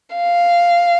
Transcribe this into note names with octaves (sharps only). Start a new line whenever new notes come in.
F5